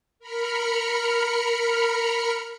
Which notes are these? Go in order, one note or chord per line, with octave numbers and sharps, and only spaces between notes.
A#4 B5 F6 C#7